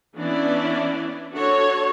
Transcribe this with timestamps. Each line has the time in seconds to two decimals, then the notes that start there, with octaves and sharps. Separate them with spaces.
0.16 E3 B3 C#4 D4 E4 D5
1.34 D4 F#4 A4 C#5